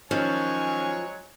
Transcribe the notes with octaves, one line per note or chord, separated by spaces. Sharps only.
D#3 F3 F#3 G#3 C#4 C#5 G#5